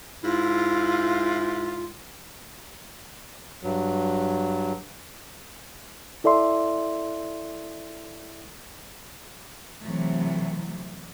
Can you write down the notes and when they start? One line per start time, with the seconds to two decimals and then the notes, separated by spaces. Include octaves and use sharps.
0.23 G#2 E4 F4
3.64 G2 F#3
6.24 E4 A4 D5 E5 C6
9.85 C3 E3 F#3 A3